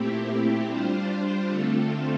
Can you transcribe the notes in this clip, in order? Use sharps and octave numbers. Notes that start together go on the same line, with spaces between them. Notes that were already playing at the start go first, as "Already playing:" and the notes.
Already playing: A#2 A3 C4 E4 G4
G3 D4 F4 C5
D3 A3 C4 F4 A4